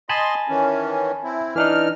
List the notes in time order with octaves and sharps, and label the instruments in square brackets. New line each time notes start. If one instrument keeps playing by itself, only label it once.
[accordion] D#5 C6 [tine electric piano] G#5 A5 B5
[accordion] D#3 E3 C#4
C4 E4
[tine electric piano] E3 D4 D#4 [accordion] F6